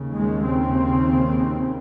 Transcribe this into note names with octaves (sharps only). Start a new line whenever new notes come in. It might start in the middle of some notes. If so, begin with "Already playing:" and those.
Already playing: D#2 C#3
G#3
C4